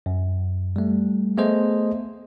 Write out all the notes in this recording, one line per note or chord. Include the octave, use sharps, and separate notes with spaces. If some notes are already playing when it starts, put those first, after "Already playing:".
F#2
G3 A3
A3 B3 G#4 C5 D#5